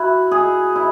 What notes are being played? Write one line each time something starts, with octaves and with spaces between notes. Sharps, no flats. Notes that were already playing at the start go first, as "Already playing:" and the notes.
Already playing: E4 F#4
G#4
E4